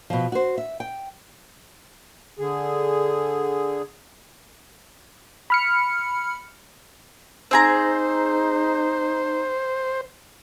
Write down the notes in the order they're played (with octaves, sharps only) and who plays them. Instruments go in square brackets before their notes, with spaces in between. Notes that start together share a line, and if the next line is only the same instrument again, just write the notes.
[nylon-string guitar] B2 F3
F#4 C5
E5
G5
[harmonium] D3 G#4
[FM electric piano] B5 F6 C#7
[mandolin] C4 G#4 A#5 [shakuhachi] D#4 [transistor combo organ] C5